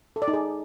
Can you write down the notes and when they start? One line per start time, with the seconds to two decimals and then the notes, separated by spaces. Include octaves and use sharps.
0.16 A4
0.22 D5
0.28 D#4
0.34 G#4